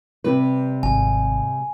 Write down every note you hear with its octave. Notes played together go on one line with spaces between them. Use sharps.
C3 G3 B4
G#1 G#5